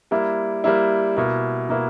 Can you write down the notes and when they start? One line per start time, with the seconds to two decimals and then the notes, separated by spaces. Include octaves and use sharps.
0.11 G3 A#3 E4
0.64 G3 A#3 E4
1.17 B2 A#3 E4
1.69 B2 A#3 E4